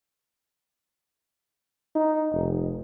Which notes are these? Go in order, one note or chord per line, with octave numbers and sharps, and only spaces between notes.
D#4
F1